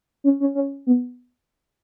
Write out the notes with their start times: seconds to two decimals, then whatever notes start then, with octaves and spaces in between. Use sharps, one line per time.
0.24 C#4
0.40 C#4
0.55 C#4
0.87 B3